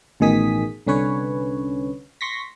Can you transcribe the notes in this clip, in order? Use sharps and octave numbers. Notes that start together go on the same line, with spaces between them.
A1 B2 D#3 G#4 D#6 B6
C2 D3 C#4 B4 C#5
C6 C#6 A#6 B6